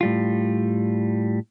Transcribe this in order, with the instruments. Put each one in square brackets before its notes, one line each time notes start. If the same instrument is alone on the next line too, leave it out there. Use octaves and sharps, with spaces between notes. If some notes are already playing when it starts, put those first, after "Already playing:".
[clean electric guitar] A2 G3 F4